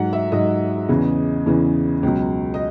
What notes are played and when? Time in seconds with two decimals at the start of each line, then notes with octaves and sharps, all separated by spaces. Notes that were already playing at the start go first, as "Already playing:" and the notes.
Already playing: G#2 F#3 F#5
0.13 E5
0.32 G#2 F#3 D#5
0.89 E2 C#3 E3
1.46 E2 C#3 E3
2.03 C#2 B2 F#3
2.54 D#5